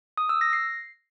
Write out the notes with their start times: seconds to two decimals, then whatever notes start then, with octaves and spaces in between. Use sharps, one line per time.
0.18 D#6
0.29 E6
0.41 A#6
0.53 C7